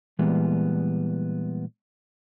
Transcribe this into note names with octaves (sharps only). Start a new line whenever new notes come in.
A#2 E3 G3 G#3 B3